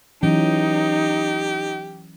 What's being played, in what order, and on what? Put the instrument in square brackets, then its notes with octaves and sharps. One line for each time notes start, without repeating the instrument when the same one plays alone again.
[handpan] E3 F#3 C#4 [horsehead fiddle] D#4 [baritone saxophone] G4